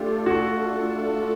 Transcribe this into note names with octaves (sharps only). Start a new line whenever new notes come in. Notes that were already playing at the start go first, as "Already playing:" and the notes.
Already playing: A3 D4 F4 G4 A4
F#4